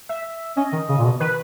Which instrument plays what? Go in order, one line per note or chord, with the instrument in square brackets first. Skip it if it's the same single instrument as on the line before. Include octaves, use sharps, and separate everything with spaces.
[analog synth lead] E5
[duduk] C#4 [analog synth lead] D#5
[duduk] D#3
C#3
A#2
B2
[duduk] D#3 [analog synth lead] B4